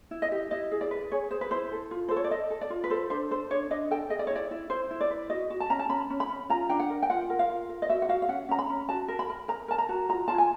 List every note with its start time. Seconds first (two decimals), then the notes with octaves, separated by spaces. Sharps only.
0.11 E4
0.22 D#5
0.32 G4
0.51 E4 D#5
0.72 G#4
0.81 D5
0.91 B4
1.12 G#4 C#5
1.31 G#4 C5
1.41 B4
1.51 E4 C5
1.72 A4
1.91 F4
2.09 A4 C5
2.16 C#5
2.24 D5
2.31 A4 D#5
2.50 A4
2.61 D5
2.70 F4
2.84 B4
2.90 A4 C5
3.10 D4 C5
3.31 A4 C5
3.51 D4 C#5
3.70 D4 D#5
3.91 A4 G5
4.10 G#4 D#5
4.19 D5
4.27 C#5
4.31 E4
4.36 D5
4.51 E4
4.70 E4 C5
4.91 E4
5.00 D5
5.10 B4
5.30 F#4 D#5
5.50 F#4
5.60 A5
5.70 C#4 A#5
5.79 A5
5.89 C#4 B5
6.10 C#4
6.20 B5
6.29 C#4
6.49 F4 A#5
6.69 D4 G5
6.80 F#5
6.90 A#4
7.02 G5
7.10 F4 F#5
7.30 A#4
7.39 F5
7.49 F4
7.69 A#4
7.82 D#5
7.89 F#4 E5
8.02 F#5
8.09 F#4 F5
8.22 F5
8.29 C#4 F#5
8.49 C#4 A#5
8.59 B5
8.70 C#4
8.89 F#4 A5
9.08 A#4
9.19 B5
9.29 A#4
9.48 A#4 A#5
9.68 A#4 A5
9.78 A#5
9.89 F#4
10.09 F4 A#5
10.28 F4 A5
10.38 G#5